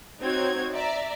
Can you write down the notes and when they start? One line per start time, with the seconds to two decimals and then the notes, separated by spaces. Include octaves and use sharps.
0.22 C4 D#4 F#4 C#5 G#6
0.73 D5 E5 A#5